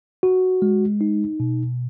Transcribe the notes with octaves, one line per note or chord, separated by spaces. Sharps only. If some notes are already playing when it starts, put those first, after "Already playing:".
F#4
G#3
D#4
B2